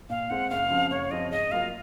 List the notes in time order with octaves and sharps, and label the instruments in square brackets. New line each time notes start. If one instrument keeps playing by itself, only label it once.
[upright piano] A#2 [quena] F5
[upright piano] G#3 C4 [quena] F#5
[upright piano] F#1 [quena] F5
[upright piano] F#2 C#3 F3 C4
[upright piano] F#1 [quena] C#5
[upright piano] F#2 C#3 F3 C4 [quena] D#5
[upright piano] G#2 [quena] D#5
[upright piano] F#3 A#3 F4 [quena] F5